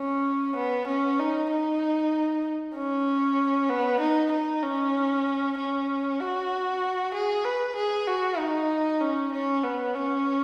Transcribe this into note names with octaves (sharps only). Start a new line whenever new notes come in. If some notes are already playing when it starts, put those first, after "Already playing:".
Already playing: C#4
B3
C#4
D#4
D#4
C#4
B3
D#4
D#4
C#4
C#4
F#4
G#4
B4
G#4
F#4
D#4
C#4
C#4
B3
C#4